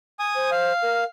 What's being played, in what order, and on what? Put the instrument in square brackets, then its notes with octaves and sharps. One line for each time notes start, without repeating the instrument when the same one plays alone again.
[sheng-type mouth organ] G#5 D#6
[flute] C5
[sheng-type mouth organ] F5
[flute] A#4